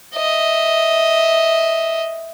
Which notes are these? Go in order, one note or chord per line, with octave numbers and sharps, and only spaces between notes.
D#5 E5